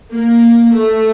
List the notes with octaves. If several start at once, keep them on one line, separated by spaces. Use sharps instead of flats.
A#3
A3